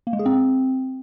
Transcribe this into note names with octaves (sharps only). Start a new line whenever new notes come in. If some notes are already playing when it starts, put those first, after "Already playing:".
A#3
G#3
G#4
C4